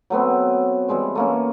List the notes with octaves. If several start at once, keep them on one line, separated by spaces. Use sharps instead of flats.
F#3 A3 B3 C4
E3 G3 G#3 C4
A3 A#3 C#4